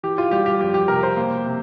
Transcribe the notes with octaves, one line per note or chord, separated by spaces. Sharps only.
E3 G4
F4
G3 G4
G4
F2 G4
G4
C3 A#4
C5
A#3
C3